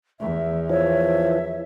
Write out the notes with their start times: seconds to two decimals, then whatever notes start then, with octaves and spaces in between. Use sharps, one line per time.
0.20 E2 E5
0.70 E3 F3 C#5 E5